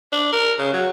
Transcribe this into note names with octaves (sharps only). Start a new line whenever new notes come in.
D4
A#4
C#3
F#3